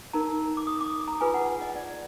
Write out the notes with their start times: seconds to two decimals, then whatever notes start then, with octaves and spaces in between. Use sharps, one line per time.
0.13 D#4 A#4 A#5
0.57 D6
0.67 D#6
0.81 D6
1.08 A#5
1.21 F4 G#4 B4 G#5
1.34 F#5
1.62 D#5
1.75 D5